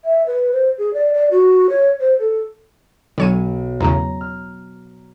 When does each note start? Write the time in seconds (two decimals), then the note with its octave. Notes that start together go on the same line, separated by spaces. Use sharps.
0.05 E5
0.27 B4
0.53 C5
0.78 G#4
0.94 D5
1.14 D5
1.31 F#4
1.70 C#5
2.00 C5
2.19 A4
3.18 B1 D3 C#5 D#7
3.81 E2 A2 C#3 A#5
4.21 F6